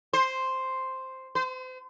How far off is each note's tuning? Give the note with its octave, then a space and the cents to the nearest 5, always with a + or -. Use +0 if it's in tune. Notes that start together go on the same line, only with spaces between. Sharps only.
C5 +0
C5 -35